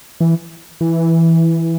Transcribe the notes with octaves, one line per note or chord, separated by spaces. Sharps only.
E3
E3